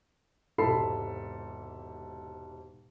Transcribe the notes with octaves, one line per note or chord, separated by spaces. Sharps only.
E1 G#2 C3 A4 B5 C7